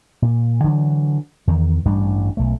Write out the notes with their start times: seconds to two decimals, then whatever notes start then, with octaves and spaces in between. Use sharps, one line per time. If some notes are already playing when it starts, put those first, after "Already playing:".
0.22 A#2
0.64 D3 E3 F#3
1.47 E2 D#3
1.85 A1 G2 G3 D4
2.37 B1 A3